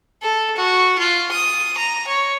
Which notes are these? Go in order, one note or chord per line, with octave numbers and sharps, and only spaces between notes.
A4
F#4
F4
D#6
A#5
C#5